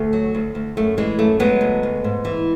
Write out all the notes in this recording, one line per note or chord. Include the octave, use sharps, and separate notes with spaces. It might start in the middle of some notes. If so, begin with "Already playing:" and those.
Already playing: D2 A3
F#3
D2
D2
F#2 A3
E3 G#3
F#2 A3
F#3 G#3 B3
D2
D2
G#2
E3